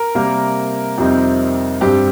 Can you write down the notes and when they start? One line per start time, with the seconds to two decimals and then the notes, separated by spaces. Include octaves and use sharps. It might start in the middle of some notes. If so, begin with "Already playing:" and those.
Already playing: A#4
0.15 C3 G3 A#3
0.98 F2 C3 G3 C4 D#4
1.81 G2 G3 C4 G4